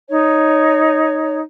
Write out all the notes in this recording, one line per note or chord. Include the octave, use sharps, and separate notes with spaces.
D#4 C#5